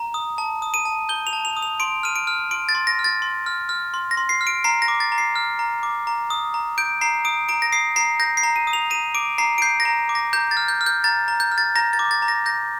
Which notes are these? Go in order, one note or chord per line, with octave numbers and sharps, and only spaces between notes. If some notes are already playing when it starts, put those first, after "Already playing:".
Already playing: A#5
D#6
A5
D#6
D#7
A5
G6 G7
F7
A5
F7
D#6
F7
C6 D7
F6 D#7
D7
F6
C6 D7
A6
C6
A#6
F6
A6
C6
F6
F6
C6
A#6
C6
C7
F6
D7
A#5 C7
A#6
D6
A6
A#5
C7
F6
A#5
D6
A#5
D#6
A#5
G6 D7
A#5 C7
D#6 D7
A#5 D7
A#6
D#6 C7
A#5 C7
G6 A#6
C7
A#5
D#7
D#6
F7
A#5 D#7
D6 D7
A#5 C7
D7
G6 C7
A#6
A#5
D6
A#6
A#5 G6
A6
F6
G6
F6
G6
A#5 A6
A#5
G6
F6
A6
A#5 A#6
A6
D6
A6
A#5
A#6
G6 A#6